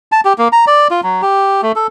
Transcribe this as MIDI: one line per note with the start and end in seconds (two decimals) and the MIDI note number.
0.12 0.21 81
0.25 0.33 67
0.38 0.48 58
0.52 0.65 82
0.67 0.88 74
0.91 1.01 65
1.03 1.21 54
1.22 1.61 67
1.62 1.72 57
1.76 1.87 69